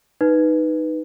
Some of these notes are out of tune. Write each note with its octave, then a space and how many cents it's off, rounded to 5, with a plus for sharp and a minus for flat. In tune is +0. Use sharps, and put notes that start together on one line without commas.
D#4 +0 B4 +0